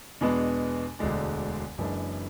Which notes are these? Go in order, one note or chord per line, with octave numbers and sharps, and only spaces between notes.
E2 B2 G#3 B3 D4
E1 D2 D3 G#3 D4
F#1 F#2 E3 G#3 D4